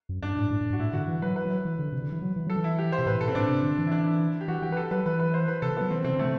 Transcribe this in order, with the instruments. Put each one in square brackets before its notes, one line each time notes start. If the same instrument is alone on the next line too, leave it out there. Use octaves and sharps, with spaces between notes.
[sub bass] F#2
[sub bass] G2 [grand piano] D4
[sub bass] A2
A2
A2
G2
[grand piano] F#4
[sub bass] A2 [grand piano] E4
[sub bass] D3 [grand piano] F#4
[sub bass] E3
[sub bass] F#3 [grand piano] B4
[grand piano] B4
[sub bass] F#3
E3
D3
C3
D3
E3
F#3
E3
[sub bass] F#3 [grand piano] A4
[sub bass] E3
[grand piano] E4
G4
C5
[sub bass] B2
[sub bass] A2 [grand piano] B4
[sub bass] B2 [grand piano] A4
[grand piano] C4
[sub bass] A2 [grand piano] D4
[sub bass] C3
D3
E3
[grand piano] E4
D4
E4
G4
[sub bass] E3 [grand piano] F#4
[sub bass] E3 [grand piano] G4
[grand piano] B4
A4
[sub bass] F#3 [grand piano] B4
[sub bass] E3 [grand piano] B4
[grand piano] B4
C5
B4
[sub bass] C3 [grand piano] A4
[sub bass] E3
[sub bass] F#3 [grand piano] B3
[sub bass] E3 [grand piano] C4
[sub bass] C3 [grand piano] C4
[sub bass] D3
[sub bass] C3 [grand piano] A3